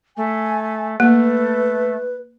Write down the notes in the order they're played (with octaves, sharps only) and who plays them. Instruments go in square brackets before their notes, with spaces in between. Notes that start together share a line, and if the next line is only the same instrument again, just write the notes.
[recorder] A3 [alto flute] G#5
[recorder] A3 [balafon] A#3 [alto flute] B4